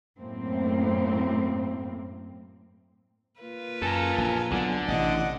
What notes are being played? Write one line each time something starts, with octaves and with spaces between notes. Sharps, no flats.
F#2 A2 A#3 C4
A#3 F4 B4
F#2 A4 A#4 G#5
A#1
B1 D3
A1 C3 D5 D#5 F#5